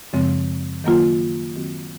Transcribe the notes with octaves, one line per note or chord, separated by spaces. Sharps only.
F#2 C#3 F3 G#3 C4
D#3 F#3 A#3 F4
D#3 F#3 C4 F#4